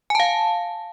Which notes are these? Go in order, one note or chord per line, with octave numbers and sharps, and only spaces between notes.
F5 G#5 A5